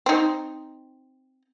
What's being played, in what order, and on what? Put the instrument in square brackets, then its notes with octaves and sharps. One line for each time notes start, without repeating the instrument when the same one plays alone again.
[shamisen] C4 D#4